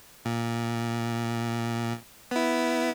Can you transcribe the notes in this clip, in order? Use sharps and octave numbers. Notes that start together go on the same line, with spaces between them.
A#2
B3 E4